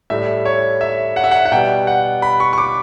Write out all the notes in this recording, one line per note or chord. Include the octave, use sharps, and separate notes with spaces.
A2 G3 E5
C#5
E5
F#5
E5
F#5
F#5
B2 G3 G5
F#5
B5
C#6
C#6
D6